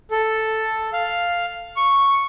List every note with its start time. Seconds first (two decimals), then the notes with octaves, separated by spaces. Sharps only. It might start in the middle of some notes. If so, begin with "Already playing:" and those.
0.11 A4
0.93 F5
1.77 C#6